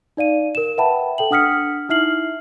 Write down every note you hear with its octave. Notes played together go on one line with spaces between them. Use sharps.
D#4 D5 F5 D#7
A#4 E7
B4 E5 F#5 G5 A5 B5
A4 G5 F#7
D4 F#5 D#6 F6 B6 C#7
D#4 E4 E5 F6 C7 F#7